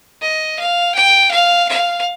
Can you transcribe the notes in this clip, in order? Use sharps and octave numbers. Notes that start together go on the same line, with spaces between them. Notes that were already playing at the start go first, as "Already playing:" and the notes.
D#5
F5
G5
F5
F5